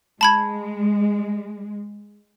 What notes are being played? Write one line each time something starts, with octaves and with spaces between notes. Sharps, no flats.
G#3 A5 B5 G#6